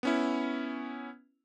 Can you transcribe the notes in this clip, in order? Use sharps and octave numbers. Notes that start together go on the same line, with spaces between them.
B3 C#4 E4